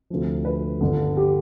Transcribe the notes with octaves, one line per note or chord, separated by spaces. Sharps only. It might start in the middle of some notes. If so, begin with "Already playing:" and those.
D2 C3 F3
B4
G1 G2 D3
G4